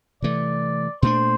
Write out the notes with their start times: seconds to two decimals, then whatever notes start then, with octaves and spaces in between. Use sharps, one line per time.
0.22 C3 E3 A3 D5
1.02 A#2 A3 D4 C5